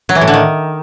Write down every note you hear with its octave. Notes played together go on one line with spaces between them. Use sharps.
F#3
E3
A2
D3
D#3